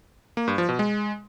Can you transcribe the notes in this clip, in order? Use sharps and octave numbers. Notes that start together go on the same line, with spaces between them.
A#3
G2
F3
B2
G#3